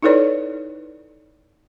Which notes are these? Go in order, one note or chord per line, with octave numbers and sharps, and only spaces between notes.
D#4 E4 A4 B4 C#5 D5